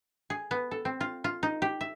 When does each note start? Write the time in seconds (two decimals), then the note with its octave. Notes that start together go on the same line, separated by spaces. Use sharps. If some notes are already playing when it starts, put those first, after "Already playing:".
0.30 G#4
0.51 B3
0.71 A4
0.85 C4
1.01 F4
1.24 F4
1.43 D#4
1.62 G4
1.81 E5